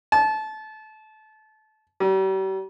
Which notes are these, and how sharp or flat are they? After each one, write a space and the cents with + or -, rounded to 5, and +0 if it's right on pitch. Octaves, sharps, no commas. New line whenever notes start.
A5 -25
G3 -40